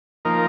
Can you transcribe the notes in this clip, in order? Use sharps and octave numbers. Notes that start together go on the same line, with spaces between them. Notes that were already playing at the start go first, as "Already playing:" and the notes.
F3 A#3 D#4 A#4